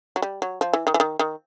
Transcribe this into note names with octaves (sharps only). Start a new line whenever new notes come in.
F#3
G3
F#3
F3
E3
D#3
E3
D#3
D#3